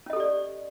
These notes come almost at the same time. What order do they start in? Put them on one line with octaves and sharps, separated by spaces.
C#4 D#5 A4 G4 D5